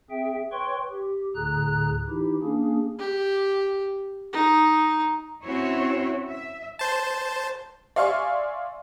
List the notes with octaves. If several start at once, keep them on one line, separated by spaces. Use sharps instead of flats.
C4 G#4 E5 G5
B4 C#5 G5 C6 C#6
G4
D2 A2 D3 G#4 A#5 F#6
E3 D#4 E4 G4
A#3 C#4 D4 G#4
G4
D#4
C4 C#4 E4 F#4 C#5
E5
C5 A5
D5 E5 F5 G#5 C6 C#6